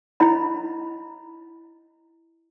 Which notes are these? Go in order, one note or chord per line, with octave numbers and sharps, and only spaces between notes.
E4 D#5 B5